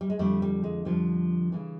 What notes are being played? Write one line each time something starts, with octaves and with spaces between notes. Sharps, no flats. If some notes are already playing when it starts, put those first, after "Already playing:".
G3
G#3
F2 D3 F3 G3 A3
G3
G#3
F2 D3 F3 G3
C#3 E3